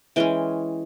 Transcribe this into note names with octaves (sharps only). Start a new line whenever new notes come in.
E3 G#3 C#4 G5